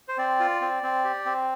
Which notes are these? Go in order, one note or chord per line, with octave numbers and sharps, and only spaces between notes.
C5
C4 D5
F4
C4
C4
G4
C4